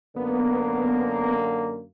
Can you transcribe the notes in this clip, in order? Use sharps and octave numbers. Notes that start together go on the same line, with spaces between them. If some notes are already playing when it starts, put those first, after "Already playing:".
F#2 D3 A#3 B3